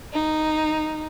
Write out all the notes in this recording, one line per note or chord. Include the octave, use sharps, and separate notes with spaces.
D#4